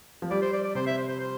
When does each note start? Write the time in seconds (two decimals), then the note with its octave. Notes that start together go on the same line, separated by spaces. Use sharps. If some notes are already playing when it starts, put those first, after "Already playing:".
0.22 F3
0.31 G3 D5
0.42 C5
0.53 D5
0.64 D5
0.75 C3 C5
0.87 E5
0.97 C5
1.09 C5
1.20 C5